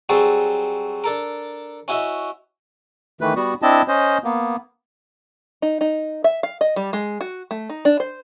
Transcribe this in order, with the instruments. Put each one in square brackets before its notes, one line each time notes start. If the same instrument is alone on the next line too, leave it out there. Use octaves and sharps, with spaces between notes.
[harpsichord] F#3 G3 C4 F#4 G#4 A4
D4 A4 A#4
C#4 E4 F#4 D#5 E5
[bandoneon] D#3 E3 A3 B4
G3 B3 F#4
C4 D4 E4 D#5 A5
C#4 C5 D#5
A#3 B3
[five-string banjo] D#4
D#4
E5
F5
D#5
G3
G#3
F#4
A3
D#4
D4
C5